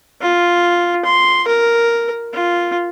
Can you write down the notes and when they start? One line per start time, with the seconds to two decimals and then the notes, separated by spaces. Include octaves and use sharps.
0.21 F4
1.05 C6
1.48 A#4
2.33 F4